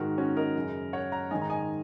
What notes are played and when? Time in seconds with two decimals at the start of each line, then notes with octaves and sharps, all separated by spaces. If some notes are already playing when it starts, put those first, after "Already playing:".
Already playing: G#2 D#3 F#4 A#4
0.18 C#4 F#4
0.37 A#4 D#5
0.56 F#2 C#3
0.93 C#5 F#5
1.12 F#5 A#5
1.31 G#2 D#3 D#5 G#5
1.42 A#5
1.50 D#5 G#5